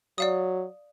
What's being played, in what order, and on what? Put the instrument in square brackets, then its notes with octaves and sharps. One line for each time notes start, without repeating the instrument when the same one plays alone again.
[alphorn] F#3 [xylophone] D5 F5 D#6